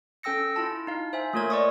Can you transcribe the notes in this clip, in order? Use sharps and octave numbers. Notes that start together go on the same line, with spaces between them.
C#4 A4 G5 E6 A#6 C#7
E4 F4 A5
D#4 F5
C5 E5 G#5
A3 A#3 F4 A#4 C#5 G#6
D5 D#5 C#6 D#6